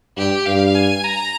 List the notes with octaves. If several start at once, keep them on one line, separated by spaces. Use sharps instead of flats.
G2 G4
G2 F5
G#5
A#5